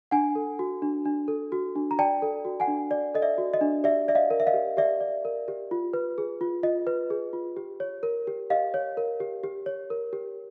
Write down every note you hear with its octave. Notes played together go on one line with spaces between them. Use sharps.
D4 F#5 G#5
A4
F#4
D4
D4
A4
F#4
D4
A#5
D5 G5 A5
A4
F#4
F#5 G#5
D4
D5
A4 D#5
D5 E5
F#4
D#5
D4
G4 D5 E5
D5 E5
D#5 F5
A#4
E5
D#5 F5
G4
G4 D5 E5
D5
A#4
G4
F4
B4
G#4
F4
F4 D#5
B4
G#4
F4
G4
C#5
A#4
G4
G4 D#5 F5
C#5
A#4
G4
G4
C#5
A#4
G4